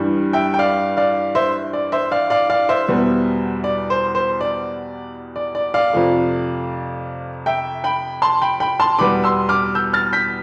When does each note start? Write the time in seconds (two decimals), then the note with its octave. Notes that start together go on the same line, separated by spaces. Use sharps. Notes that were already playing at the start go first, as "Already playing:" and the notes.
Already playing: G2 E3 G3
0.33 E5 G5
0.54 G5
0.59 D5 F5
0.97 D5 F5
1.35 C5 E5
1.73 D5
1.92 C5 E5
2.11 D5 F5
2.30 D5 F5
2.50 D5 F5
2.69 C5 E5
2.88 E2 B2 G3 B3
3.64 D5
3.90 C5
4.15 C5
4.41 D5
5.36 D5
5.55 D5
5.74 D5 F5
5.93 F2 C3 F3 A3
7.46 E5 G5
7.84 G5 B5
8.22 A5 C6
8.42 G5 B5
8.60 G5 B5
8.80 A5 C6
8.98 E2 B2 G3 B3 B5 D6
9.24 C6 E6
9.49 D6 F6
9.75 E6 G6
9.93 F6 A6
10.13 G6 B6